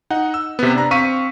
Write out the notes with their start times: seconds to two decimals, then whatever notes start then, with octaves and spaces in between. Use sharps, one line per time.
0.10 D#4 F#5
0.34 E6
0.59 C3 B3
0.75 D4 A#5
0.91 C4 F5 C#6 B6 D#7